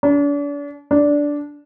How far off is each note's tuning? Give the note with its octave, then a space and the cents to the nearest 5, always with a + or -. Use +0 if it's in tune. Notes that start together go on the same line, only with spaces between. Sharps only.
D4 -40
D4 -10